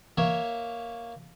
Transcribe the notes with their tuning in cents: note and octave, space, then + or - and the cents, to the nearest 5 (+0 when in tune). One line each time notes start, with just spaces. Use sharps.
A#3 +0 C#5 +0 E5 +0